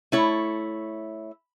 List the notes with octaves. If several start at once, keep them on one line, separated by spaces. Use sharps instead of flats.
A3 E4 C#5